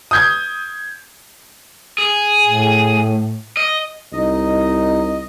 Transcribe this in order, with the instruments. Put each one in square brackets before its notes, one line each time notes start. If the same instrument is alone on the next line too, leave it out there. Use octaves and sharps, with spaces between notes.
[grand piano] D#6 G6 G#6
[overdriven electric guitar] G#4
[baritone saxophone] A2
[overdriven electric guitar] D#5
[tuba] C2 [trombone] D#4 [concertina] D#5